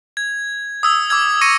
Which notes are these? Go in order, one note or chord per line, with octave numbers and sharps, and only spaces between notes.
G#6
D#6 E6 G#6
D6 E6 G#6
C#6 D#6 A#6 C#7 D#7